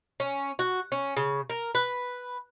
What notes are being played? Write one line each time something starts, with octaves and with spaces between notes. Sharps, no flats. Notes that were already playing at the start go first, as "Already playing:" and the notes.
C#4
F#4
C#4
C#3
A#4
B4